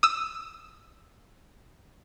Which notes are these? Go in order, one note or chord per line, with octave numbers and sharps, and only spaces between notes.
D#6 E6